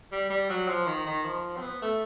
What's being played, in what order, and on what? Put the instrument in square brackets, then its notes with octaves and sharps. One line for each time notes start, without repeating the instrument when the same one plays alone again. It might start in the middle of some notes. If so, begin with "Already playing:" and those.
[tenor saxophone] G3
G3
F#3
F3
D#3
D#3
F3
C4
B3
A3